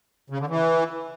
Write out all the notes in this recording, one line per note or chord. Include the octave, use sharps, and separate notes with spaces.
C#3
D3
E3